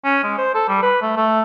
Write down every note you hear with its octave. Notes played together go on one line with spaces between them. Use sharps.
C#4
G#3
C5
A4
G3
B4
A3
A3